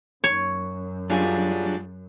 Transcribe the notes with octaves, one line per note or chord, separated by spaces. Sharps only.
F#2 C#5
F#3 G3 D4 F4 G#4